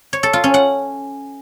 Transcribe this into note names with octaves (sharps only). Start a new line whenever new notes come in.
C#5
A4
F4
C#4
F#5